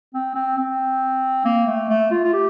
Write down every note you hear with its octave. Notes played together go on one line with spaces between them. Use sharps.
C4
C4
C4
A#3
A3
A3
F4
F4
G4